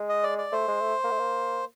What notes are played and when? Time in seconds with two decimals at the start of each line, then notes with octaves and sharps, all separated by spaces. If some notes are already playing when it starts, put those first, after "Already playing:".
Already playing: G#3
0.09 D#5
0.23 D5
0.38 D5
0.52 A3 C5
0.68 G#3
0.81 A3
1.04 A#3
1.11 A3
1.19 A#3